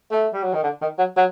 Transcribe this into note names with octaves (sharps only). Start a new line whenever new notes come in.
A3
G3
F#3
D#3
D3
D#3
F#3
F#3